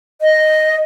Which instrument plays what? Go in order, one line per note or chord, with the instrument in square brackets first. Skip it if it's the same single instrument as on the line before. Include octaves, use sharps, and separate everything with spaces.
[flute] D#5